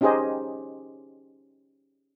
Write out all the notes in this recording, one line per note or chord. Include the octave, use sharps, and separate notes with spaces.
C#4 D#4 G4 G#4 C5 D#5